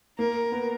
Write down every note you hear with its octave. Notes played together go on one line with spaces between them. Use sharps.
A#3 A#4
B3